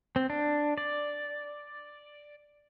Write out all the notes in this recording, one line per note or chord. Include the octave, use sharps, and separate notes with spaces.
C4
D4
D5